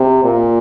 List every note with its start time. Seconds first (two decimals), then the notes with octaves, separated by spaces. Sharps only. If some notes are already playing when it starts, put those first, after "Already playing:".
Already playing: C3
0.24 A#2